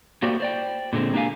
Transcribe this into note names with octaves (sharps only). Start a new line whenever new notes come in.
A3 A#3 F#4 G4 C5 D5
C5 D5 G5
A#2 D3 G#3 C4
A#3 D4 G4 F5 G#5